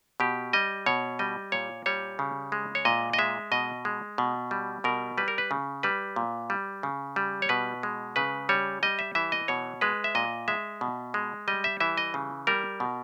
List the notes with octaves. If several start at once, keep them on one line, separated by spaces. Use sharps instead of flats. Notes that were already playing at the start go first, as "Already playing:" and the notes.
B2 G4
G3 D#5
B2 C#5
G3 D#5
A#2 C#5
G3 C#5
C#3
G#3
C#5
A#2 D#5
D#5
G#3 E5
B2 D#5
G#3
B2
G3
B2 A#4
G3 B4
A#4
B4
C#3
G3 B4
A#2
G3
C#3
G3
C#5
B2 B4
G#3
C#3 B4
G3 C#5
G3 D#5
E5
E3 E5
D#5
B2 C#5
G#3 B4
E5
A#2 D#5
G#3 E5
B2
G#3
G3 D#5
E5
E3 E5
D#5
C#3
G3 A#4
B2